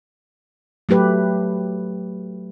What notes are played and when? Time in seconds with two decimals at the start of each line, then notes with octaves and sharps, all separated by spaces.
0.89 F#3 A3 G4 B4